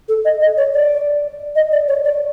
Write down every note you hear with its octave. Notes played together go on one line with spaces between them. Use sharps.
A4
D#5
D#5
C#5
D5
D#5
D5
C#5
D5